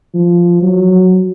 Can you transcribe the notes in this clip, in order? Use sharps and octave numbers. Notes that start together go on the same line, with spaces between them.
F3
F#3